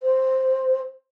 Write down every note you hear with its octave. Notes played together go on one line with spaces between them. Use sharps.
C5